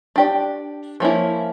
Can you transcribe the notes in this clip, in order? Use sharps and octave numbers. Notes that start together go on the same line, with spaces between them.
D4 G4 D5
F3 A#3 C#4 E4